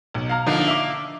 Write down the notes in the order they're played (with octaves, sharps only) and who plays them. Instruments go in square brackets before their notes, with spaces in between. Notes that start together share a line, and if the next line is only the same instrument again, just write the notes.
[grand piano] B1
F5 A#5 F6
[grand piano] D3 F3 [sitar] A#3 D4 D#4
[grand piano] E5 D6